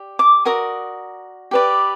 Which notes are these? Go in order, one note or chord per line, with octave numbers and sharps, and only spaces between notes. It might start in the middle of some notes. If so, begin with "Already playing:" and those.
Already playing: G4 D5
D6
F#4 A#4 D5 D#6
G4 B4 D5